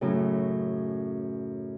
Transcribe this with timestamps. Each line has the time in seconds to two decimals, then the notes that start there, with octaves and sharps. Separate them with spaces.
0.01 F#2 A2 C#3